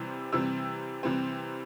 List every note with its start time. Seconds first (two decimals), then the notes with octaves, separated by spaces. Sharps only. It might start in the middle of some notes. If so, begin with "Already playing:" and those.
Already playing: C3 E3 G3 C4
0.32 C3 E3 G3 C4 E6
1.03 C3 E3 G3 C4